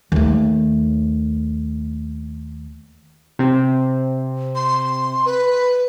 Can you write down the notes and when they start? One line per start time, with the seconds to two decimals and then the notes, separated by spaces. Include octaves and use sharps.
0.12 D#2 A3
3.39 C3 C4
4.55 C6
5.26 B4